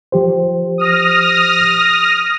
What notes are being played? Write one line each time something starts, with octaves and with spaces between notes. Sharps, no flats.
F3 G4 C5
D#6 F6 A#6